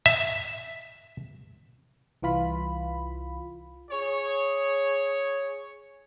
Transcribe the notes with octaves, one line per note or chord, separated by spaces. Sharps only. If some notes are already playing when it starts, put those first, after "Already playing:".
E5
C2 E3 F4 B5
G#4 C#5